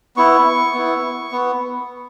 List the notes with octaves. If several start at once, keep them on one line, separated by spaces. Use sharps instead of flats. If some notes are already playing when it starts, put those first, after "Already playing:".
B3 E4 C#6
B3 E4
B3